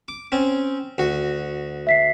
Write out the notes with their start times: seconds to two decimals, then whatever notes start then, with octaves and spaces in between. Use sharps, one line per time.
0.08 D6
0.32 C4 C#4
0.98 D2 F#4
1.87 E5 B6 C7